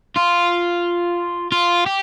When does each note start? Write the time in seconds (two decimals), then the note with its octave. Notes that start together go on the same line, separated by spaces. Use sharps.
0.17 F4
1.52 F4
1.86 G4